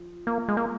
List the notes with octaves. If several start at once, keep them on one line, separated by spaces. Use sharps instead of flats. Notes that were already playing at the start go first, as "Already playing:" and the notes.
Already playing: F3
A#3
G#3
A#3